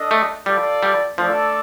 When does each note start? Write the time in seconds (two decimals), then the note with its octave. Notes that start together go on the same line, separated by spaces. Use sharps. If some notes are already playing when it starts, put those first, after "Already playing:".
Already playing: D4 A4 D#5
0.11 A3
0.46 G3 F4 A4 D5
0.83 G3
1.18 F3 A3 D4 A4 D5